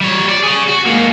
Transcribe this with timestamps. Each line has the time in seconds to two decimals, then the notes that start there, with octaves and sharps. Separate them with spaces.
0.01 G3 C#5
0.28 D5
0.43 G#4 C#5
0.68 F#4
0.86 G#2 A#3